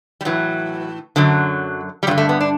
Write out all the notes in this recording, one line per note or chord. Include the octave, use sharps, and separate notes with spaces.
G3
A2 E3 F#3
F#2 D3 F#3
G3
G2 D3 F#3
A3
B3
D4